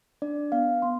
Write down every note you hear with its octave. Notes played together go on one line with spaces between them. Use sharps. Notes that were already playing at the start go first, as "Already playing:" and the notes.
D4 D5
B3 F5
B3 C6